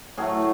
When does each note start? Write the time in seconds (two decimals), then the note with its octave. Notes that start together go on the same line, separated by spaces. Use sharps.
0.17 A2 F#3 A3 G#4